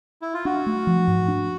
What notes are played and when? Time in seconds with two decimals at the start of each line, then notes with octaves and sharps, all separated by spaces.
0.22 E4
0.34 F4
0.45 D4 F#4
0.66 A3
0.87 F3
1.08 G#2
1.28 D4